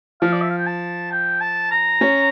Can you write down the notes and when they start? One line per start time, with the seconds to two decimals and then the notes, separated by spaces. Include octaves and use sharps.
0.22 F3 F5
0.33 D5
0.41 E5
0.50 F5
0.58 G5
0.66 A5
1.11 G5
1.41 A5
1.71 A#5
2.01 C#4